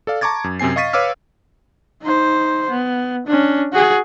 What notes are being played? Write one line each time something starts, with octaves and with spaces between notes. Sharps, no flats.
A4 D5 F5
A5 A#5 C#6 D6 G#6 A6
F#2
F#2 C3 C4 G#5 C7
D#5 F5 C#6 A6 B6 D#7
B4 C#5 F5 D6 E6 F6
D#4 C5
B3
C#4 D4
F#4 G#4